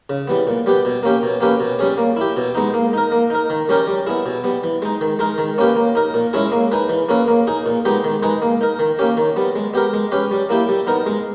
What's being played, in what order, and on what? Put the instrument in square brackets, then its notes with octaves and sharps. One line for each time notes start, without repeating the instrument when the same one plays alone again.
[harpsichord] C#3
E3 G3 B3
A#2
G3 B3 G4 B4
B2
A#3 C#4 G4
B2
A#3 C#4 G4 B4
B2
G3 C#4 G#4
A#3
E4 G4
B2
G#3 B3 D#4
A#3
D#4 A#4
A#3
D#4 A#4
D#3
G3 C#4 G4 A#4
G3
B3 E4 G#4
B2
G3 B3
E3
G#3 D#4
D#3
G#3 D#4 A#4
D#3
A#3 C#4 G4 B4
A#3
D#4 A#4
A#2
G#3 C#4 E4 G#4
A#3
D#4 G#4 B4
E3
A#3 C#4 G#4 B4
A#3
D#4 G#4
A#2
G#3 B3 D#4 G4
D#3
G#3 D#4 G#4 B4
A#3
D#4 A#4
D#3
A#3 C#4 G4
D#3
G3 B3
G#3
B3 G4 A#4
G#3
C#4 G4 B4
G3
A#3 E4 G4
G3
B3 D#4 A#4
G#3